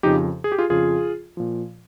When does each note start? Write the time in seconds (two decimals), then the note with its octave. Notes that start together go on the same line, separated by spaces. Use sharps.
0.03 F2 C#3 F3 D#4 G4
0.44 G#4
0.52 G4
0.58 F4 G#4
0.70 F2 C#3 F3 F4 G#4
1.37 A#2 F3